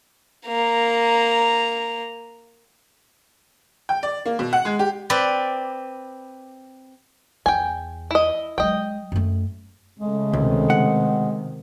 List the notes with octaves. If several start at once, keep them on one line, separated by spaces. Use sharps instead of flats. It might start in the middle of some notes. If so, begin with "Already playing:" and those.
A#3 A#5
G5
D5
A#3
B2
F#5
G#3
G4
C4 B4 D5
E2 G5 G#5
E4 D#5
F#3 G#3 D#5 G5
F#2 A3
C#3 G#3 A3
C#2 C3 D#3
F#5